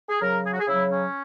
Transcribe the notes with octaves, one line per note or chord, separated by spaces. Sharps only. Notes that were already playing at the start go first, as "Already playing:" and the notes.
G#4
C#3 F#3 A#4
G#4
F#4
G#4
C#3 F#3 E4
C#4